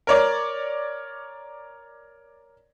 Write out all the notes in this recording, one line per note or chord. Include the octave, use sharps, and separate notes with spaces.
A#4 C#5 D5